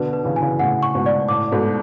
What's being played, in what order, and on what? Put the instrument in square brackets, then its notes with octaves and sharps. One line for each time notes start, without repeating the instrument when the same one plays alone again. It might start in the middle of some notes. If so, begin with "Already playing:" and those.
Already playing: [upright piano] B2 D3 [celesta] B4
[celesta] B4
[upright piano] C#3 E3
[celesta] G#5
[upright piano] C#3 E3
[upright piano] A2 C#3 [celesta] F#5
[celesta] C#6
[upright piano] G#2 B2
[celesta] D5
[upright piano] A2 [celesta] D6
[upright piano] G#2 B2 [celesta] A4